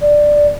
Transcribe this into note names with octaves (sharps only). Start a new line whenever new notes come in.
D5